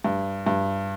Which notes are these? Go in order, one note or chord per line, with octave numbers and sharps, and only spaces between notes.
G2
G2